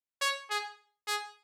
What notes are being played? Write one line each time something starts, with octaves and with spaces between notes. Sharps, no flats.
C#5
G#4
G#4